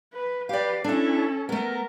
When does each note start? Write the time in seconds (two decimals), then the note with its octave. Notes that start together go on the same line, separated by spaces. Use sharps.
0.14 B4
0.49 G4 B4 D5 F5
0.84 C#4 D4 E4 A4
1.49 A3 B3 A#4